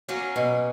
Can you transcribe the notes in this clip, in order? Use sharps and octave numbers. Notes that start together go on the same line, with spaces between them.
F#3 A#3 C#4
B2